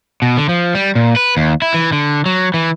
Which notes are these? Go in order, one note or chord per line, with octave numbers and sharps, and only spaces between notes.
B2
D3
F3
G3
A#2
B4
D#2
E4
E3
D3
F#3
E3